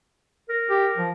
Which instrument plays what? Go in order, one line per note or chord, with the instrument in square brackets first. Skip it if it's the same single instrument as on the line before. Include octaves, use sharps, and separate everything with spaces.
[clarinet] A#4
[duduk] G4
F3